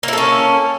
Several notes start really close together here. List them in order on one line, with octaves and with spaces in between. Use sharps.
A#3 E4 A4 C#4